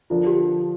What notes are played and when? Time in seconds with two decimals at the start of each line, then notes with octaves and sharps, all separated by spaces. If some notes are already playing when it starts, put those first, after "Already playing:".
0.10 D3 F3 D4 F4 A#4
0.27 G4